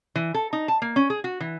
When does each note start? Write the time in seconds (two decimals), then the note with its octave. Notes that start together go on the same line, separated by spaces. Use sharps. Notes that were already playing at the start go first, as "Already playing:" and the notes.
0.15 E3
0.34 A4
0.53 D#4
0.68 A5
0.82 A#3
0.96 C#4
1.10 G#4
1.24 F#4
1.40 E3